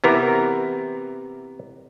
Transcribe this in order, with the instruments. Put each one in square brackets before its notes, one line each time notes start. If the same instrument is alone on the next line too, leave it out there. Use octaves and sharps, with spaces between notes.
[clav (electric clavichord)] C3 E3 B3 A#4